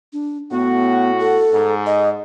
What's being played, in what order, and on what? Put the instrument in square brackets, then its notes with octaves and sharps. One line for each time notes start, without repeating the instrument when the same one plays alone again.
[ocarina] D4
[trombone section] A2 F#4 [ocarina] B3
[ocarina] A4
[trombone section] G#2
[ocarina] D#5